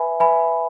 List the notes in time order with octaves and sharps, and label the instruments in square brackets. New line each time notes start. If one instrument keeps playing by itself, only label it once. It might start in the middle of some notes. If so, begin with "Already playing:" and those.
Already playing: [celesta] B4 E5 G#5 B5
B4 E5 G#5 B5